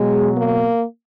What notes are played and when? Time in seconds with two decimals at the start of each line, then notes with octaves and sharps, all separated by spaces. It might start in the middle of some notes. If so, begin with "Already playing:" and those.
Already playing: B2 F#3 G#3
0.38 A#3